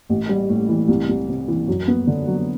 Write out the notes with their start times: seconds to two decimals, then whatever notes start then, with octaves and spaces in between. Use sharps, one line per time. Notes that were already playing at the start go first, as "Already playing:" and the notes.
0.10 A1
0.29 G3
0.49 A2
0.69 E3
0.88 C2
1.09 C2
1.29 C3
1.48 E3
1.68 F#2
1.88 B3
2.07 D3
2.27 F#3